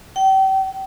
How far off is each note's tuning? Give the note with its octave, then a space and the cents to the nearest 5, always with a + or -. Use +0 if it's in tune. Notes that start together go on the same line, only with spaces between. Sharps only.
G5 -35